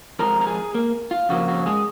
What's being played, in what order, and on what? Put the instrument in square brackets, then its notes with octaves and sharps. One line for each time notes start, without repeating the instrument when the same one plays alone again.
[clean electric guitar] F2 F3 G#3 A#4 A#5
A#5
G#4 G#5
A#3 A#4
F4
F2 C#3 F3 A#3 F#4
F#4
G#3 G#4